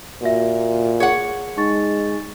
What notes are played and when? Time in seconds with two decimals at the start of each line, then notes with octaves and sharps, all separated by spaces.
0.22 A#2 F#4 E5
1.00 G#4 C#5 F#5
1.57 G#3 D#4 C#6 A6